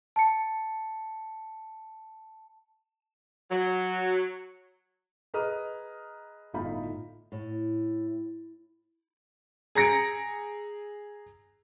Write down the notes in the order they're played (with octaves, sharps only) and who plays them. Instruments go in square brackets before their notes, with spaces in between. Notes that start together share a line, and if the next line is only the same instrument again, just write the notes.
[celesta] A5 C#7
[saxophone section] F#3
[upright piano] G#4 B4 D#5 A#5 D#6 F6
G1 A2 D#4 F4 B5
[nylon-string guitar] A2
[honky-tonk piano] G#4 A#5 A#6 C#7 D7